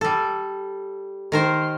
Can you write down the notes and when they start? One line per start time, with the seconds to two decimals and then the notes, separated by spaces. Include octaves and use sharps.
0.01 G3 A4
1.32 D#3 A#4 C5